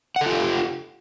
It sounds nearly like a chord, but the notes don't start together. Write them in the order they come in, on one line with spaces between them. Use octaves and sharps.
F#5 A4 F4 G4